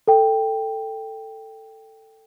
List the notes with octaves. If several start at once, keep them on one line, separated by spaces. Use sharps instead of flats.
A4 G5